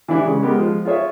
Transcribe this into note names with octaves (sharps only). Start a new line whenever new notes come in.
E3 D4 E4 G4
C#3 G#3
G#3 B3 G4 A#4
F3 G#3
F4 G#4 C#5 E5